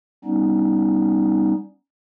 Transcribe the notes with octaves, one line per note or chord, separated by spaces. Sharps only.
G3 B3 C#4 D#4